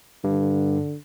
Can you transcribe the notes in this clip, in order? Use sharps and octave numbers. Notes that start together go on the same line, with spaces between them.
G2 D3